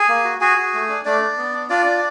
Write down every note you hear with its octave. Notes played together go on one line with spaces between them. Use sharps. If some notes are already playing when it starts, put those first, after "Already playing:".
Already playing: G#4 G#5
A#3
F#4
F#4 G#4 G#5
F#4
A3
D4
A3 D4 D5
D4
B3
D4
D4 F4 D5
D4